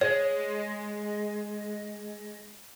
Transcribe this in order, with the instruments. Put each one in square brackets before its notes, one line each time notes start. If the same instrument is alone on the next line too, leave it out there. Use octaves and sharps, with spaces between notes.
[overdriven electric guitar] G#3 [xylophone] C#5